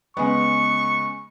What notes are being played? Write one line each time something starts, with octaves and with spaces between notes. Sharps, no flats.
C#3 G#3 B3 C#6